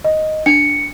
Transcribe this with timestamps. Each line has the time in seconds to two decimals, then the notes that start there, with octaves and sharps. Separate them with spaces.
0.04 D#5
0.46 D4 G5 C#7